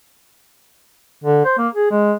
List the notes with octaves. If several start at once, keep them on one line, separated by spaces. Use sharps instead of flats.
D3
C5
A#3
G#4
G#3